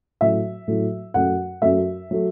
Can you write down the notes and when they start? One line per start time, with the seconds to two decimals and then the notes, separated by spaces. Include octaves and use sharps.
0.21 A2 F#3 A3 E5
0.68 A2 F#3 A3
1.14 F#2 F#3 A3 F#5
1.62 F#2 F#3 A3 E5
2.11 F#3 A3